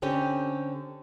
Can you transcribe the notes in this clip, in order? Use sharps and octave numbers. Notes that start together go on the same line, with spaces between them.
D3 C4 C#4 G4